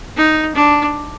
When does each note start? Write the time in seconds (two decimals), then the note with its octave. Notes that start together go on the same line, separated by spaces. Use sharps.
0.17 D#4
0.55 D4